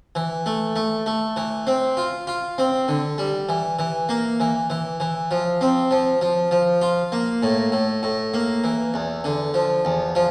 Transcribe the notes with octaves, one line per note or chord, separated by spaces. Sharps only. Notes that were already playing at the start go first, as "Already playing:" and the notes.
E3
A3
A3
A3
E3
C4
F4
F4
C4
D3
G3
E3
E3
A#3
E3
E3
E3
F3
C4
F3
F3
F3
F4
A#3
A2
A2
A2
A#3
E3
E2
D3
F3
E2
F3